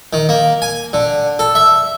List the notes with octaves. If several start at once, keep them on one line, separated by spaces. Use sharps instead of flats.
D#3
A#3
G#5
D3
A4
E5